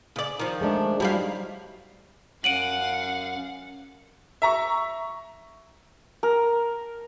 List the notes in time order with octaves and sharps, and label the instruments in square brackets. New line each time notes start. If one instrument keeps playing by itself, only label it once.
[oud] C#3 D5
D#3 F3
[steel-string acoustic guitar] G#3 A3 D4
[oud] G2 E4 F5 [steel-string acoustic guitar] F#3 G3 D#4
[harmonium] F#2 [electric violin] F5 F#5 [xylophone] D7 D#7 F#7
[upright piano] E5 A#5 C#6
[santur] A#4